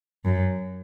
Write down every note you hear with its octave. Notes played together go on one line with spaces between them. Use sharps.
F#2